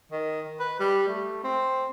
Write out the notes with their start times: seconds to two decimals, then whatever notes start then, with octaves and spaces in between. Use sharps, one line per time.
0.12 D#3
0.60 B4
0.80 G3
1.08 A3
1.44 C4